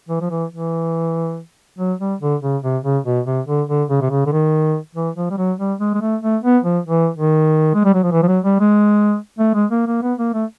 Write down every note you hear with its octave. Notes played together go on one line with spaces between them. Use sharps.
E3
F3
E3
E3
F#3
G3
D3
C#3
C3
C#3
B2
C3
D3
D3
C#3
C3
C#3
D3
D#3
E3
F3
G3
F#3
G3
G#3
G#3
A3
A3
B3
F3
E3
D#3
G#3
G3
F#3
F3
E3
F3
F#3
G3
G#3
A3
G#3
A#3
A#3
B3
A#3
A3